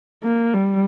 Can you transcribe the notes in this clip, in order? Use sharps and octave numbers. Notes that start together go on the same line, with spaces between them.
A#3
G3